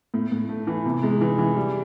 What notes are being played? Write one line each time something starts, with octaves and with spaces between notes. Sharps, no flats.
A2
A2
A3
E3
C3
G#3
E3
E3
G3